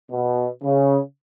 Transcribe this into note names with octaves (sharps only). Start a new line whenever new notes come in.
B2
C#3